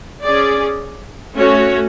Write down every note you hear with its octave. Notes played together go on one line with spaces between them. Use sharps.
C#4 G#4 D5
A3 C#4 F#4 C#5